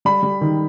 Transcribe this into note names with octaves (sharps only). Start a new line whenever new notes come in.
G3 B5
G3
D#3